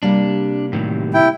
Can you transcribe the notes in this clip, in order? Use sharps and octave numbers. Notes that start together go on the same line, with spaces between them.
C3 G3 A#3 D4
A2 D#3 F#3
E4 G5